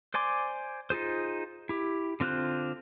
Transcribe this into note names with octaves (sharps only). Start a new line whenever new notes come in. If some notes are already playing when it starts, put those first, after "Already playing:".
C5 D5 G#5 C6 D6
D#4 F4 G#4 C5
E4 G4
D3 C4 F4 C5 F#6